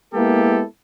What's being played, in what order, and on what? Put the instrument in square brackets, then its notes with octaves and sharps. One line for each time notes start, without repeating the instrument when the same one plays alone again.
[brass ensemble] G#3 A#3 B3 E4 G4 A4